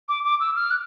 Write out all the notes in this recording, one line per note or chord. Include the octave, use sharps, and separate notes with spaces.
D6
D6
E6
F6
F#6